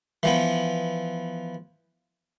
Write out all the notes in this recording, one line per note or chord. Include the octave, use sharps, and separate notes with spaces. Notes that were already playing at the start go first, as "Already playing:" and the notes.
E3 F3 B3